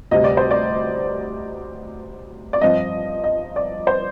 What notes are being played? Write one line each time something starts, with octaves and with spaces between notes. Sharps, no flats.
D2 C3 G3 D#5
D5
C5
D5
D5
G2 F3 C4 D#5
D#5
D5
C5